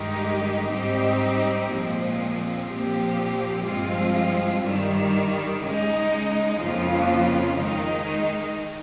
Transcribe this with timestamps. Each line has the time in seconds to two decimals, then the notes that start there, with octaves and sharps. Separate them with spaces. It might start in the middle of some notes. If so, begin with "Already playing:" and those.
Already playing: G2 D#3 G#3 D#4 G4
0.72 G#2 G3 C4 D#4 G4
1.70 A#2 F3 G#3 C4
2.68 A#2 F3 C4 G4
3.66 G2 F3 G#3 C4 F4
4.65 G2 D#3 G3
5.63 C#3 G#3 D#4
6.61 F2 C#3 F3 A#3 F4
7.59 D#3 G#3 D#4